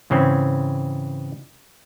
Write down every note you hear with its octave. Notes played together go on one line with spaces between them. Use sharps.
G#2 C#3 E3 C4 C#4